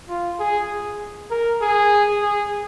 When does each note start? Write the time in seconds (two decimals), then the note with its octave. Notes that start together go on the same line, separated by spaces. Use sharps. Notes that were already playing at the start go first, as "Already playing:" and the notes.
0.09 F4
0.39 G#4
1.31 A#4
1.61 G#4
2.22 G#4